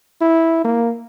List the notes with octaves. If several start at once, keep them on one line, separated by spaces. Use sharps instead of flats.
E4
A#3